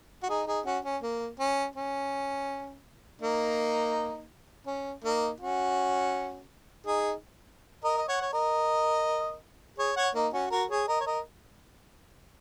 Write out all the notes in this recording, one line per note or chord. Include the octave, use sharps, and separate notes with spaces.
F#4
D#4 G#4
D#4 G#4
C#4 F#4
C#4
A#3
C#4
C#4
A#3 D#4
C#4
A#3 D#4
C#4 F#4
D#4 G#4
A#4 D#5
D#5
C#5 F#5
C#5
A#4 D#5
G#4 C#5
C#5 F#5
A#3 D#4
C#4 F#4
F#4 A#4
G#4 C#5
A#4 D#5
C#5
A#4 D#5